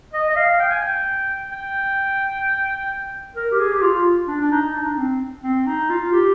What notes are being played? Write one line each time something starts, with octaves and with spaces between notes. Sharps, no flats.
D#5
D#5
F5
G5
G#5
G5
G5
A#4
G4
G#4
G4
F4
D4
D4
D#4
D4
D#4
D4
C4
C4
D#4
F4
G4